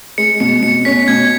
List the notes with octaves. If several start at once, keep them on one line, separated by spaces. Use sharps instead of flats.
G#3 C#7
B2 C#7
B2 C#7
C#4 B6
B2 G#6